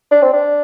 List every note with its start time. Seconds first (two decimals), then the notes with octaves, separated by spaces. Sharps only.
0.11 D4
0.22 C4
0.33 D4